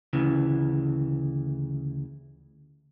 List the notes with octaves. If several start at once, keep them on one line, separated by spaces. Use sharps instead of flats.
D2 C#3 E3